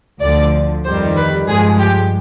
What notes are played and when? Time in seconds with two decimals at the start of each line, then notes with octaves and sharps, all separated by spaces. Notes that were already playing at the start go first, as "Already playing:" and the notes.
0.21 D2 D3 F3 D5
0.85 F2 D#3 G3 C5
1.17 B4
1.48 G2 F3 G#3 G#4
1.79 G4